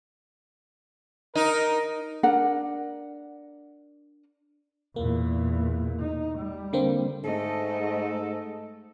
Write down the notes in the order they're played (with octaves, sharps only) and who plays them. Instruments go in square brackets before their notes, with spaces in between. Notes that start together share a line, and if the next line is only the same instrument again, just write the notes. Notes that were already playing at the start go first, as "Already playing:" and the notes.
[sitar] D#4 [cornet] A#4
[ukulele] D4 A#4 F#5
[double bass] E2 A#2 [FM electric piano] A#3
[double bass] D#4
G3
[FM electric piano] D3 A#3 C4
[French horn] G#2 [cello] A3 D#5 [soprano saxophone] A4